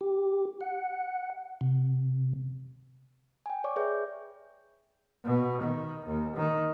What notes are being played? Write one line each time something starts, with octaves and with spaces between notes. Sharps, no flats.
G4
F#5
C3
G5 G#5
C#5 D5 C#6 D6
G#4 B4 C#5 E5 C#6 G6
B2
D#3
D#2
D#3